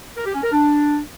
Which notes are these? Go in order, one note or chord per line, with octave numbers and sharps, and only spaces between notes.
A#4
G4
C#4
A#4
D4